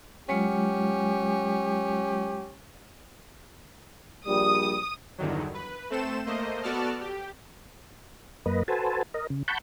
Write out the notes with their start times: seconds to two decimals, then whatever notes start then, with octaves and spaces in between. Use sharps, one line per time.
0.29 F#3 G#3 C#4 F4 G4
4.27 A#1 G3 D#6
5.18 E2 G2 D3 D#3 F#3
5.54 B4
5.90 A3 C4 A4 C5 E7
6.26 A3 A#3 C5 D#5
6.63 B3 F#4 A4 D5 A5 F6
7.01 G4
8.46 F#2 A#3 B4 D#5
8.68 F#4 A4 B4 C5 G#5 A5
9.14 A#4 D#5
9.30 C#3
9.48 F#5 A5 B5 C#6 G6